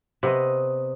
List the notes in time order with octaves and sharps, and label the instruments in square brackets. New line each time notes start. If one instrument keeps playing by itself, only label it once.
[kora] C3 B3 D#5